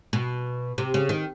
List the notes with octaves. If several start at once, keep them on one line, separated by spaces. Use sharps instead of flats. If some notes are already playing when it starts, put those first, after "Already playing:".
B2
C3
C#3
D#3